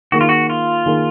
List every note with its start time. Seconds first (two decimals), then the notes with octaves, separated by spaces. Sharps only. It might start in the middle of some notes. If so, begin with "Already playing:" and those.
0.12 D#3 A#3 D#4 F#4 G#4
0.21 F4
0.29 F#4
0.50 F4
0.86 D#3 A#3 D#4 G#4